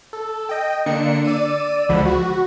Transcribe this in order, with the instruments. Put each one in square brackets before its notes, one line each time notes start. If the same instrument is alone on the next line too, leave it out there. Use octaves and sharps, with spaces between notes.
[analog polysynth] A4
D#5 G5
D3 A#3 D4 C#7
D5 E6 D#7
C#2 D3 F3 G#3 F#5 B5
F#4